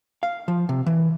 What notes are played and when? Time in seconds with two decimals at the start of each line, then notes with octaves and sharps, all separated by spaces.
0.23 F5
0.48 F3
0.69 C3
0.86 E3